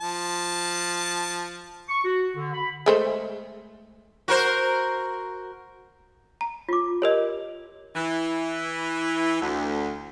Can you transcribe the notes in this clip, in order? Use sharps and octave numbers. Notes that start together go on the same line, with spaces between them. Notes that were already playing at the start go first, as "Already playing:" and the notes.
F3 A5
C#6
F#4
D3
B5
G#3 A3 C5
F#4 A#4 C5
A#5
F4 D6
G4 A#4 C#5 D#5
E3
D2